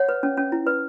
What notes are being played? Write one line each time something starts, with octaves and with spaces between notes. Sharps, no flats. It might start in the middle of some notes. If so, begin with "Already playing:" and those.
Already playing: C#5 F#5
B4
C#4
C#4
E4
B4